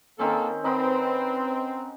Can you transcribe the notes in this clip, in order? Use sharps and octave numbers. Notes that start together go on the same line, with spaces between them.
D#3 A#3 C4 C#4 A4
C4 D#4 B4 F#5